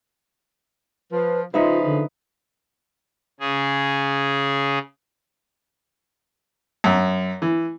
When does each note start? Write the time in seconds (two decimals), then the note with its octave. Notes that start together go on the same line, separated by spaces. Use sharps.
1.12 F3 B4
1.54 C#3 F3 D#4 F4 B4 E5
1.85 D3
3.40 C#3 G#4
6.84 F#2
7.42 E3